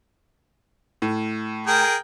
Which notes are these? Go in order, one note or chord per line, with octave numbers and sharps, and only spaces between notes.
A2
G#4 A#4 G5